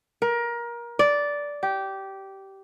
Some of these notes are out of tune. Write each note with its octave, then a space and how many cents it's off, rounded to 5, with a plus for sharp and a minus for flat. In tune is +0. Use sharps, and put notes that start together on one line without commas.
A#4 +25
D5 -10
G4 -15